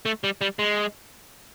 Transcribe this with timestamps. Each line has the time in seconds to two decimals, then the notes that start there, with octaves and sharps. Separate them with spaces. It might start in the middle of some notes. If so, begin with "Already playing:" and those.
0.05 A3
0.24 G3
0.41 G3
0.59 G#3